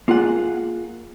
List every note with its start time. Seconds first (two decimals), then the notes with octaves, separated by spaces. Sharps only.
0.08 A#3 F4 G#4 F#5